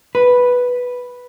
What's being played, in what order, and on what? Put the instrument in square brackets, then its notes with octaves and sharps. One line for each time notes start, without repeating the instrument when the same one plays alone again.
[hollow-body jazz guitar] B4